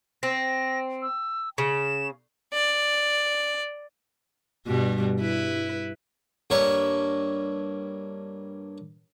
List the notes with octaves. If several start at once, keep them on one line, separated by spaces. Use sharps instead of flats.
C4 A#6
E6
C#3 E7
D5
G2 B2 G3
E4 B4
G2 A#3 C#5 E5 C#6